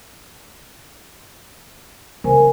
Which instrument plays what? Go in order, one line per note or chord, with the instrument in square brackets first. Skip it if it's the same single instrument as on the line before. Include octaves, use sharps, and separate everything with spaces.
[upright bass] C#3 [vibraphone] A#4 C5 G#5